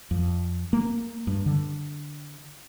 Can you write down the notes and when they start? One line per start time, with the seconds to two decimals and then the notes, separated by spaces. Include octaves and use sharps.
0.11 F2
0.73 A#3
1.27 G2
1.46 D3